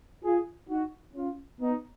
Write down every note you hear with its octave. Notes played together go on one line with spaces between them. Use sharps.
F4 G#4
D#4 F#4
C#4 F4
B3 D#4